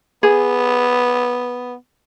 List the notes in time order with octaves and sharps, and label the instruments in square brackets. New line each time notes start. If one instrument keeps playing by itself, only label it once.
[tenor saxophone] B3 [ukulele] G#4